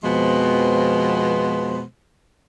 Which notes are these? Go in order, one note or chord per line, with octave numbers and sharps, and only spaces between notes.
F2 B2 F3 G#3 B3 C5